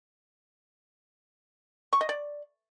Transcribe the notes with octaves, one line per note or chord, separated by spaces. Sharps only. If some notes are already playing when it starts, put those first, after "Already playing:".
C#6
D#5
D5